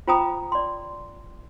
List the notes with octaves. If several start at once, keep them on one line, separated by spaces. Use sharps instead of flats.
F4 C5 G5 A#5 B5 D#6
D5 C6